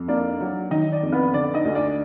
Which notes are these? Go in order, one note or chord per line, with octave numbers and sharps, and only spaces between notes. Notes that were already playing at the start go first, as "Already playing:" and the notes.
Already playing: F2
A#3 D4 D5
F#3
D#3 D#4 D#5
D4 D5
F2
B3 B4
D3 D4 D5
D#4 D#5
D2
D4 D5